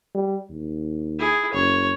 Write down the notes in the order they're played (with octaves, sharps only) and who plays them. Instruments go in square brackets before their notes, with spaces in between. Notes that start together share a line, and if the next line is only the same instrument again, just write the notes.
[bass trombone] G3
D#2
[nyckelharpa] E4 G#4
[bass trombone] F#1 [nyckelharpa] C#5